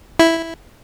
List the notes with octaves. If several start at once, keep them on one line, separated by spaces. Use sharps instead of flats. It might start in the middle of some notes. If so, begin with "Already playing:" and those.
E4